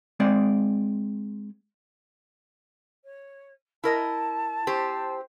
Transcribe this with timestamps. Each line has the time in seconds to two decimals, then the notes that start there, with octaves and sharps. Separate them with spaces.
0.20 G#3 C4 D5
3.04 C#5
3.84 E4 A#4 D#5 A5
4.67 C4 G4 C5